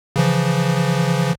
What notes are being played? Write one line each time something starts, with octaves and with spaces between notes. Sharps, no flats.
C#3 E3 F3